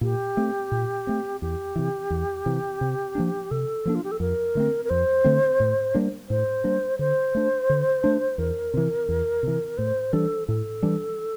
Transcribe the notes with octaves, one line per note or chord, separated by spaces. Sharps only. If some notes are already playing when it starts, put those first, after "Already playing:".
A#2 G4
A3 C4
A#2
A3 C4
E2 G4
C3 E3
E2
C3 E3
C3
F3 A#3 D4
C3 A4
F3 A#3 D4
F4
G4
A4
F2 A#4
D3 A3 C4
A#4
F2 C5
D3 A3 C4
A2
G3 A#3 D4
A2 C5
G3 A#3 D4
D3 C5
A3 D4
D3
A3 D4
E2 A#4
C3 E3
E2
C3 E3
A2 C5
E3 G3 D4 A4
A2 A4
E3 G3 D4